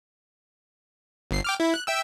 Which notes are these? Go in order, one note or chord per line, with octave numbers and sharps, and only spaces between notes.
G1 C7
G5 D6 F6
E4
F#6
E5 G5 E6